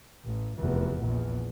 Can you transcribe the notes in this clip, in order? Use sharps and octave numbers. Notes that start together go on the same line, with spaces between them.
A1
F1 E2
A#1 E2